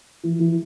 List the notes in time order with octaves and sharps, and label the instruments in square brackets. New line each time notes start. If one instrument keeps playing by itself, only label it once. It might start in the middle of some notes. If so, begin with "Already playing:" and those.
[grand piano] E3
E3